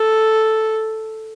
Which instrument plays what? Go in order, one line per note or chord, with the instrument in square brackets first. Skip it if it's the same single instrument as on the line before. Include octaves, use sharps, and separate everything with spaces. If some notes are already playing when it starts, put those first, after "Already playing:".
Already playing: [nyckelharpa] A4